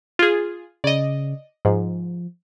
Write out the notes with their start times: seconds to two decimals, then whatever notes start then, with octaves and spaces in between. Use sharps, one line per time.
0.19 F4 G#4
0.84 C#3 D5 D#5
1.65 G#2 F3